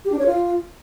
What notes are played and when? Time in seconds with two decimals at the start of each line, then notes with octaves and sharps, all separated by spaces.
0.05 G4
0.12 D4
0.19 C#5
0.26 F4